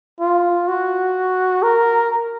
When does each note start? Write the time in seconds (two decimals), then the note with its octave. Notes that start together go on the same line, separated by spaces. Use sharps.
0.20 F4
0.68 F#4
1.63 A#4